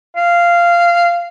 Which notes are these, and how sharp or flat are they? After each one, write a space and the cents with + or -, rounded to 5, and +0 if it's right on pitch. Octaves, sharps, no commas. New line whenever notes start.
F5 -15